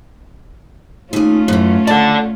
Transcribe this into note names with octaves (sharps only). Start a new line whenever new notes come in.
D#2 A3 C#4 F4 G#4
F#2 E3
A4 D5 A5